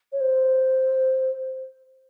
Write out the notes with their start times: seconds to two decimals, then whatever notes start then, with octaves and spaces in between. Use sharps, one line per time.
0.12 C#5
0.20 C5